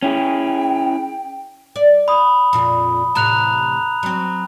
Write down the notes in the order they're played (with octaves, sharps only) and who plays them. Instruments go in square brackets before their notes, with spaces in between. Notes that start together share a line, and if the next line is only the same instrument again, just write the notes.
[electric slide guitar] C#4 E4 G#4 [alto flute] G5
[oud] D5
[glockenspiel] B5 D#6
[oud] F2 A#2 F4
[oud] E2 A2 C3 [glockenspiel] A#5 F#6 F7
[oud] F#3 C4